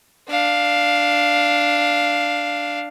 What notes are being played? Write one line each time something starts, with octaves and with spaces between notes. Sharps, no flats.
D4 F5